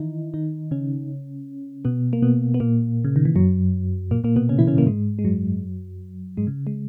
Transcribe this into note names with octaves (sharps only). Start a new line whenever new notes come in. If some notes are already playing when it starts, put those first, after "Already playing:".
Already playing: D#3 E3 D#4 E4
D#3 D#4
C#3 C#4
B2 B3
A#3
B2 B3
B3
A#2 A#3
C#3
D#3
E3
F#2 F#3
A#2 A#3
A#2 A#3
B2 B3
C#3 C#4
E3 E4
C#3 C#4
A#2 A#3
G#2 G#3
G#3
F#2 F#3
G#2 G#3
C#3
G#3